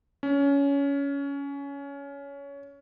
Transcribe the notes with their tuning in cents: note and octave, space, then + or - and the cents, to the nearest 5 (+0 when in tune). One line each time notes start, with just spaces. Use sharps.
C#4 +20